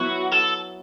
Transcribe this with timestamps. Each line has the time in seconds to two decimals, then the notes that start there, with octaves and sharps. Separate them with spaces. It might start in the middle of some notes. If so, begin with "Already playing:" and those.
Already playing: F#3 B3 E4 F#4 B4
0.32 A4